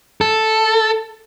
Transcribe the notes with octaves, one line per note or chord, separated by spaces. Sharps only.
A4